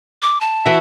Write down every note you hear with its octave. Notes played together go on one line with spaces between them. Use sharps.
D6
A5
E3 F#4 E5